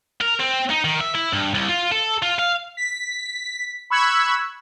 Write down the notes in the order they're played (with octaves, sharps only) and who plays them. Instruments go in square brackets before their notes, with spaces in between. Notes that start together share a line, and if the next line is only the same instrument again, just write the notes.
[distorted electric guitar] A#4
C4
D#4
D#3
E5
E4
G2
C2
F4
A4
F4
F5
[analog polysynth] B6
B5 C#6 E6 F#6 G#6